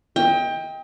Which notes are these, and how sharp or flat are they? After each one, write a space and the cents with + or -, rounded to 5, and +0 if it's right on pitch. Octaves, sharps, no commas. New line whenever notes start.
D#5 +40 G5 +20